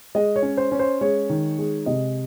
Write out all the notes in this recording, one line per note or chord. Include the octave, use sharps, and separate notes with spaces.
G#3 D#5
C#5
C#4
C5
C#4
C5
G#3 C#5
D#3
G#3
C3 D#5